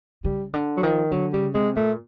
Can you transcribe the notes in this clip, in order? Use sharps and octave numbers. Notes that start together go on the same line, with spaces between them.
C#3 G3
D3
F#3
D#3 F3
D3 F#3
C#3 G3
C3 G#3
A#2 A3